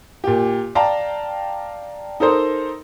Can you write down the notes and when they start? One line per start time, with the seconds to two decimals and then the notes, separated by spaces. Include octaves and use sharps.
0.24 A#2 G4
0.75 D5 F5 G5 A5 A#5
2.20 D#4 A4 A#4 C5